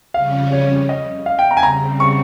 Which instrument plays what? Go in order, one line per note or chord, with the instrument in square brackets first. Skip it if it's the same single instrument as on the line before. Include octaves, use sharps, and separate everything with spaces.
[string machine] F2 C#3 G3 C#4 [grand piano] F5
[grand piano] C#5
D#5
F5
G5
A#5
G#5
[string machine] C#3 G3 C4 [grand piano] A#5
[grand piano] C#6